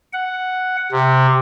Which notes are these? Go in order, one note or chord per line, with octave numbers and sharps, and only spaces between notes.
F#5
C3